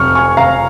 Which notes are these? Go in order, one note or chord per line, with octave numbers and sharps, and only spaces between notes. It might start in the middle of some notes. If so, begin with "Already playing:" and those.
Already playing: F1 C#6 F6
G#5 C#6
F1 F5 A#5